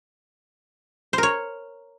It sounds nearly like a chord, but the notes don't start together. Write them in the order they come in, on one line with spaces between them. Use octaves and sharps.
C5 A#4 C#5